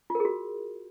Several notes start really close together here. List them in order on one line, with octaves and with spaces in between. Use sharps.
F4 A#4 G#4 F#4